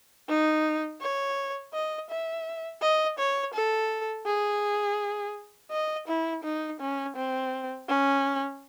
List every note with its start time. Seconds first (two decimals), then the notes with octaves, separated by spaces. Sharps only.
0.29 D#4
1.01 C#5
1.74 D#5
2.10 E5
2.82 D#5
3.19 C#5
3.54 A4
4.27 G#4
5.71 D#5
6.08 E4
6.44 D#4
6.81 C#4
7.16 C4
7.89 C#4